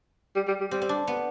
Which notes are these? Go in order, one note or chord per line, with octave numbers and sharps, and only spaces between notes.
G3
G3
G3
G3 C4
C4
D4
B3